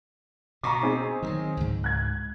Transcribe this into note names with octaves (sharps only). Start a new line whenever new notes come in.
B2 A#5 C#6 D6
C4 D#4 G#4
D#3 E3 F#3
C#2 G#2
F#6 G#6